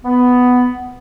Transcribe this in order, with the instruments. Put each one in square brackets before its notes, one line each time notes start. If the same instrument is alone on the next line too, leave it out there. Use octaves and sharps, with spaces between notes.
[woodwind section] B3